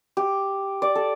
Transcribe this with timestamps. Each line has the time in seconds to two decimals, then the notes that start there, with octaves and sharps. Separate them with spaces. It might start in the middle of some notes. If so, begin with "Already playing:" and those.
0.17 G4
0.82 D5
0.95 A4